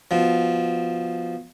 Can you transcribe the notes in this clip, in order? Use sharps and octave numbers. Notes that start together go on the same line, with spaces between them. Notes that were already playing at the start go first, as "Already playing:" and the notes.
B2 F3